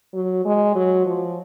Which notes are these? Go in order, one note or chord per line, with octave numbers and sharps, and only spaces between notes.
F#3
G#3
F#3
F3